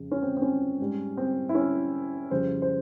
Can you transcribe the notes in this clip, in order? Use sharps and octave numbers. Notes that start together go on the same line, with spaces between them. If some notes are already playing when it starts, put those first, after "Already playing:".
Already playing: F2 C#3 F3 G#3
C#4
C4
C4
C#4
G#2 G3
C4
E4
C#4
F2 C#3 G3 C5
C5